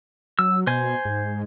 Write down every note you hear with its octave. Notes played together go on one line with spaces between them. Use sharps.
F#3 E6
B2 C5 G#5
G#2